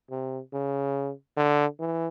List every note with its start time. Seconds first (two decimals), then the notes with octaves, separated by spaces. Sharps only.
0.10 C3
0.53 C#3
1.37 D3
1.79 E3